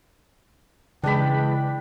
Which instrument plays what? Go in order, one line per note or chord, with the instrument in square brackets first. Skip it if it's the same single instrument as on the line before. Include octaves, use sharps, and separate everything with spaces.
[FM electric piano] C#3 [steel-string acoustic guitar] E3 G#3 [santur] D4 B5 [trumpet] G5